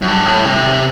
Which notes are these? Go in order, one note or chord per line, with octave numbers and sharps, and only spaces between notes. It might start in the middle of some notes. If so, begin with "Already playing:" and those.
F#2
G2
A2
C3